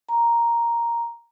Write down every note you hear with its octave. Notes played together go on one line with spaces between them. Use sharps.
A#5